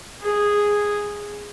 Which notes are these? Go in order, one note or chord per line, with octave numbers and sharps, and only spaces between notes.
G#4